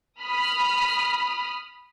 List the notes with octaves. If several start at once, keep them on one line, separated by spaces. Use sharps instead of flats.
B5 D#6 F6